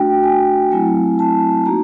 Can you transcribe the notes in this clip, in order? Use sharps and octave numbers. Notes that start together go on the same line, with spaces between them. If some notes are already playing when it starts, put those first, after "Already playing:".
Already playing: A3 D4 F#4 G5
G#5
F#3 A3 C4 E4 G#5
A5
A#3 D#4 F#4 A#5